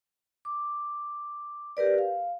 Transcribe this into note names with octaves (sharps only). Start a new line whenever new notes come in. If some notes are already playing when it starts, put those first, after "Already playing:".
D6
G4 A#4 B4 D5
F5